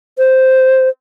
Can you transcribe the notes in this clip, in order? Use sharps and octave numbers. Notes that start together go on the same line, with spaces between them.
C5